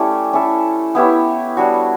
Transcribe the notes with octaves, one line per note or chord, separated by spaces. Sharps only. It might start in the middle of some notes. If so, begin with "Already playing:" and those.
Already playing: A3 C#4 E4 G4 D5
C#4 E4 A4
B3 E4 G4 C#5
G3 D4 F#4 C#5